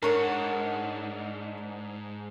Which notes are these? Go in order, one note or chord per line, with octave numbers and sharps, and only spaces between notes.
G#2 D4 A#4 C#5 F#5